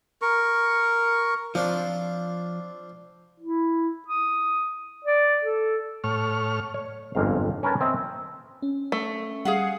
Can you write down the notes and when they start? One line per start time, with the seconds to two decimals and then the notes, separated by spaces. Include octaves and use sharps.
0.22 A#4 C#6
1.55 F3 C4 D4 F4
3.40 E4
4.08 D#6
5.05 D5
5.45 A4
6.04 A2 C#5 F6
6.74 C#5
7.15 G1 F2 G#2 F5
7.63 C#4 A#4 B4 C#5 A5
7.81 C4 D#5 E5
8.62 C#4
8.92 A3
9.45 G3 G#4 F5 F#5